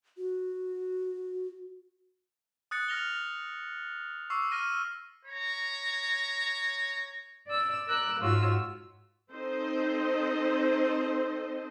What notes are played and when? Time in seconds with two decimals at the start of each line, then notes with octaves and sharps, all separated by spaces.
0.18 F#4
2.71 D#6 F#6 A6 C#7
2.88 F6 A#6 F7 G7
4.30 C#6 D6 E6 C7
4.51 F6 A#6 D#7
5.25 C#5 A#5
7.46 D5 E6
7.86 A#4 D6 E6 F#6
8.19 G#2 F4 F#4 C#5 E6
9.30 C4 D#4 A4 C5 D#5